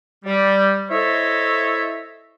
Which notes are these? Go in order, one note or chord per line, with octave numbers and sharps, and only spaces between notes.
G3
E4 A4 C5 C#5 D#5 E5